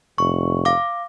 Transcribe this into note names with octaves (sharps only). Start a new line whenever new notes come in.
F1 C#6
F5 D6